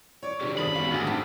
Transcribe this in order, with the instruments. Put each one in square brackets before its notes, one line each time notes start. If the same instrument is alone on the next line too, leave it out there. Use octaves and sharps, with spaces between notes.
[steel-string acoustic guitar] C#5 D5 [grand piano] C#6
[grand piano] C3 D#3 F3 [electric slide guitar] C#4 G4 G#4
[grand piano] G#1 C4 D#6 [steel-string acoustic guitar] A4 [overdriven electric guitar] B5
[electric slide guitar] B3 G4 F5 [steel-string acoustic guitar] F#4
[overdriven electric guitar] D2 [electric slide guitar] G#2 D3 G#4
[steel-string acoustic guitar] C4 [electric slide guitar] D#4 C5 A5